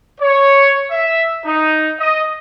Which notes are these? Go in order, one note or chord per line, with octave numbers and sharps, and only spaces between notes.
C#5
E5
D#4
D#5